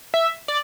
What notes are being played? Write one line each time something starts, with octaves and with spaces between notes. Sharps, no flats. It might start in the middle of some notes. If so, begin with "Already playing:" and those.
E5
D5